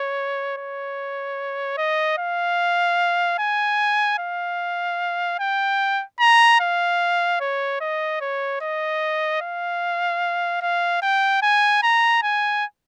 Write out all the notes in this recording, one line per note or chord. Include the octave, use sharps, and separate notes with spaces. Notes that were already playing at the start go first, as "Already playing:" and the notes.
Already playing: C#5
C#5
D#5
F5
G#5
F5
G5
A#5
F5
C#5
D#5
C#5
D#5
F5
F5
G5
G#5
A#5
G#5